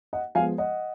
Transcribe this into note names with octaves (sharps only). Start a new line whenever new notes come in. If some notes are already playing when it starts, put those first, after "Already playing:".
D#5 F#5
F3 G#3 B3 F5 G#5
D#5 F#5